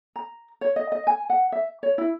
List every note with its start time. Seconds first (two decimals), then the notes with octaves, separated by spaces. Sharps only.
0.16 A#5
0.61 C#5
0.76 D#5
0.92 D#5
1.07 G#5
1.30 F#5
1.52 E5
1.83 C#5
1.98 E4